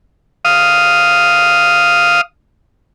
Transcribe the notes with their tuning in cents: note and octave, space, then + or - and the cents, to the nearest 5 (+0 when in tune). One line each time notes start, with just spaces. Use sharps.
F5 +0 D#6 +0